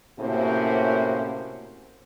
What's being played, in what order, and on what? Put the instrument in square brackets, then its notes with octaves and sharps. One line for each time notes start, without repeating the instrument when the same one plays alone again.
[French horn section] A2 C3 A#3 C#4 F#4 C5